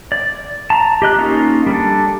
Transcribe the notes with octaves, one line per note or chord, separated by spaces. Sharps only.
D5
A5 A#5
G4 D#5 F#6
A#3 C#4 D#4 F4
G3 D4 A4